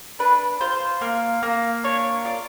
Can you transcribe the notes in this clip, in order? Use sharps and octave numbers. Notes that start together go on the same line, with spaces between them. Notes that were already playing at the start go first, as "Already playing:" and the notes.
D4 B4
F4 C5
A#3
A#3
D4 C#5
F4 D5